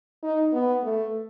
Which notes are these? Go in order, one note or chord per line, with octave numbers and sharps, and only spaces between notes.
D#4
B3
A3